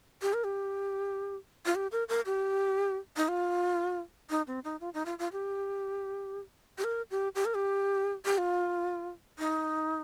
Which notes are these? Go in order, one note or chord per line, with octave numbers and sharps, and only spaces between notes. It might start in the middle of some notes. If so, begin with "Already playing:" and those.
G4
A#4
G4
F4
G4
A#4
A#4
G4
D#4
F4
D#4
C4
D#4
F4
D#4
F4
F4
G4
G4
A#4
G4
G4
A#4
G4
G4
F4
D#4